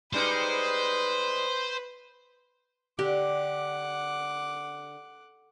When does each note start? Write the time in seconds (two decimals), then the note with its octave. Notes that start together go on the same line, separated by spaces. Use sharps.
0.13 G3 G#3 D#4 B4 C5
2.99 D3 G4 F#5 D6